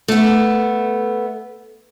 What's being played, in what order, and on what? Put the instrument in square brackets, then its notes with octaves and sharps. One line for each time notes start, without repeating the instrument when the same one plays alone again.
[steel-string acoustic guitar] A3 B3